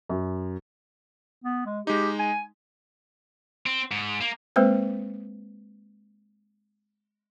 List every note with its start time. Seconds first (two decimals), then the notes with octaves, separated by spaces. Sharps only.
0.09 F#2
1.45 B3
1.66 G#3
1.87 G#3 D#4 G4
2.19 G#5
3.66 C4
3.92 G#2
4.21 A#3
4.56 G#3 A#3 C4 B4 C5